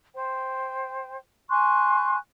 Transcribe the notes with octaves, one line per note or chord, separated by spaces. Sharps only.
C5 G5
G#5 C6 C#6 F#6